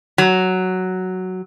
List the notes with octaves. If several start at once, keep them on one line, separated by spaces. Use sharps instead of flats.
F#3